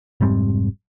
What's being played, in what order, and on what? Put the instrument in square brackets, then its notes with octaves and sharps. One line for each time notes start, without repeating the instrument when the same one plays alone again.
[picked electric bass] F1 G#2 G3 C4